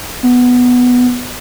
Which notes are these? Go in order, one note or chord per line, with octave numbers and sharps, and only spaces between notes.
B3